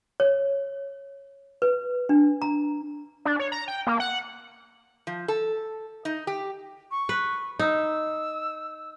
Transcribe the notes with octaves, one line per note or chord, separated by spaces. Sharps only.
C#5
B4
D4
A#5
D4
C#5
A#5
G5
A#3
F#5
F3
A4
D#4
G4
C#6
B4
D#4 E6